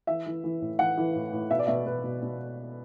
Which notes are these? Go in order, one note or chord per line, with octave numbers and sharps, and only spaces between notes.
E3 E5
E3
E3
A2
E3 F#5
E3
A2
A2
B2 E5
D5
B2 E5
B2 B4
B2
B2